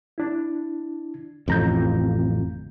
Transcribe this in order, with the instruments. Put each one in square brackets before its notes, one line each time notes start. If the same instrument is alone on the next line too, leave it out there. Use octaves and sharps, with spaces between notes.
[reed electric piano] D4 E4
[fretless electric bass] A1 F2 [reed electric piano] D3 A#5 G6